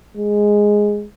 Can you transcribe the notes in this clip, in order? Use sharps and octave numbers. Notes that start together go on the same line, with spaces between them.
G#3